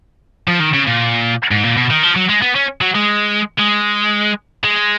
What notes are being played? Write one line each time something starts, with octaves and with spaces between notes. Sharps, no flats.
F3
D#3
C#3
A#2
G#2
A#2
B2
D#3
F3
F#3
G#3
B3
C#4
F#3
G#3
G#3
G#3